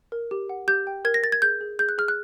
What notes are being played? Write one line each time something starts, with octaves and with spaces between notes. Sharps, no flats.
A#4
G4
F#5
G4 G6
G5
A#4 G#6
A#6
A#4 A6
G#6
G#4 G6
G#4
G#4 G6
F#6
G#4 F6
F#6